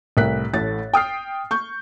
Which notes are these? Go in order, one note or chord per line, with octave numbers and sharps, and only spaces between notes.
C2 A2 A#4 F#6 B6
A1 A2 A3 A6
G5 D#6 F6 C7
C#6 G6